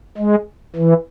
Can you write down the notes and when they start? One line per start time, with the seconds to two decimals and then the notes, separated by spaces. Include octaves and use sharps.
0.18 G#3
0.76 E3